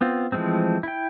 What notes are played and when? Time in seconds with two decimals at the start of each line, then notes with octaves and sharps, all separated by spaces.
0.01 B3 C4 F4
0.32 E3 F3 G#3 A3 C4
0.83 E4 G5